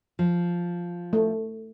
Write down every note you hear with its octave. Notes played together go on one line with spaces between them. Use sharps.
F3
A3